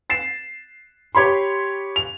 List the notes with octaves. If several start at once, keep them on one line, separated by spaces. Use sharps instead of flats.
A6 C7 E7
G4 C#5 B5 C6
F7